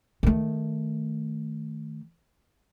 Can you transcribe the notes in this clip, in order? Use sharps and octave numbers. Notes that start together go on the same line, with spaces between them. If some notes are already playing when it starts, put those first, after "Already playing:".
D#3 A3